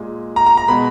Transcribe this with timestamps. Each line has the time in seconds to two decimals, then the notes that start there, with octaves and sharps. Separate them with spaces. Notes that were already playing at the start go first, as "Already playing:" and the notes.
Already playing: A#2 G#3
0.36 A#5
0.46 A#5
0.57 A#5
0.68 B2 G#3 B5